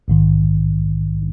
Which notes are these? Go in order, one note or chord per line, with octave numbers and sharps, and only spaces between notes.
A#1 G#2 D#3